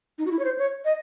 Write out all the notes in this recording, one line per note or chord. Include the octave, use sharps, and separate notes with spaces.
D#4
F#4
E4
C#5
C5
C#5
D#5